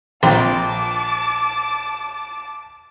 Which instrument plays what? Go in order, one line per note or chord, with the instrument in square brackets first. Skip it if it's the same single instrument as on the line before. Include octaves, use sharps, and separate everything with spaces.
[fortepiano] A#1 [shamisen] C4 [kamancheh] A5 D6